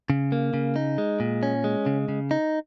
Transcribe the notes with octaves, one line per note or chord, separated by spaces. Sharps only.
C#3
A#3
C#3
D#4
G#3
A#2
C#4
G#3
C#3
C#3
D#4